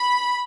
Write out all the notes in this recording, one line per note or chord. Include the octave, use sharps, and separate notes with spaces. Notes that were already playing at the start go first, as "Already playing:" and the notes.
Already playing: B5